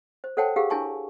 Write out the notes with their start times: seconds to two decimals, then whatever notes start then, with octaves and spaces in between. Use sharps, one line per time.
0.24 C5
0.37 A4 C5 C#5 F#5 G5 A5
0.56 G4 G#4 A#4 F5 F#5
0.70 D4 E4 A#4 G#5 A5 C#6